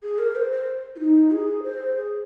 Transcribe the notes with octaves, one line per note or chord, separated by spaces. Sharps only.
G#4
A#4
C5
C5
F4
D#4
G#4
C5
G#4